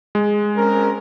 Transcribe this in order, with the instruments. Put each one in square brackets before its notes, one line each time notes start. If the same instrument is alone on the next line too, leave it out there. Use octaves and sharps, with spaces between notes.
[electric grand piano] G#3
[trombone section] C4 C#4 A#4